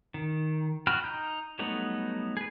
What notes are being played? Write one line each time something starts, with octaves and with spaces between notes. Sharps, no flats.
D#3
F#4 G5 B5 F6
D#4 A#5 G6
F#3 G3 A3 B3 D#4
G#4 B4